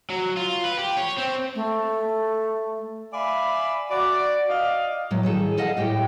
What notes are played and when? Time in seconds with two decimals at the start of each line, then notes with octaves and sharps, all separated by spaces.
0.10 F#3
0.37 F4
0.64 B4
0.78 G4
0.97 C#5
1.18 C4
1.55 A3
3.13 D5 E5 F5 G#5 B5
3.90 F#4 D5
4.48 D5 D#5 F5
5.11 A2 F#3
5.23 D#3 G#4 A4
5.58 A4 D#5 F5 F#5
5.77 A2 G4 G5